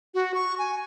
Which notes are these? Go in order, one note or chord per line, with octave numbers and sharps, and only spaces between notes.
F#4
C#6
G#5